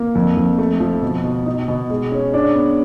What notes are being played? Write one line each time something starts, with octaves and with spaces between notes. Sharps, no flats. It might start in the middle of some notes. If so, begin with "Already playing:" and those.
Already playing: A#3
F2
F2
A3
F3
B2
B2
D#4
B2
G#3
C#4
D4
B3